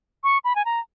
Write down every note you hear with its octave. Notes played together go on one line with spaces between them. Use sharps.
C#6
B5
G#5
A#5